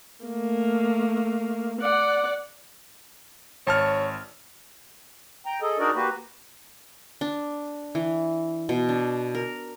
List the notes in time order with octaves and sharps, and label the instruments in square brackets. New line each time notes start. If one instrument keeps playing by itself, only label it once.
[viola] A3 A#3
D5 F#5
[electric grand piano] G#1 A5 F6 [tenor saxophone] C#5
[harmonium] G5 A#5
G#4 A4 D#5
D4 D#4 F#4 G#4 A#4 D5
A#3 F#4 G4 B4
[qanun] D4
E3
B2
D4
A#4